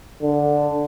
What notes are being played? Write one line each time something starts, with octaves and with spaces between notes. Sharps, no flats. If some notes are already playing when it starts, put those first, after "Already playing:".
D3